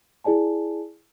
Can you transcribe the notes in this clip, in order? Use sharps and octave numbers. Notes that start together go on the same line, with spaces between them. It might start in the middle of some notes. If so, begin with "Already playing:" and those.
E4 G#4 D5 G#5 A5